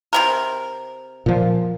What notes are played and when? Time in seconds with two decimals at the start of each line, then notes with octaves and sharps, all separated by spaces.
0.13 C3 F#3 A#4
1.26 A#2 F3